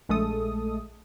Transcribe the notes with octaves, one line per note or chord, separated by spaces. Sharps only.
A#1 G#3 A3 A4 D#6